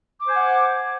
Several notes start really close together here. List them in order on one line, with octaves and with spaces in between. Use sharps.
D6 C5 G#5 F#5